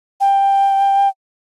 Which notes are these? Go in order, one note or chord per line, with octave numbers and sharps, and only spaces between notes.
G5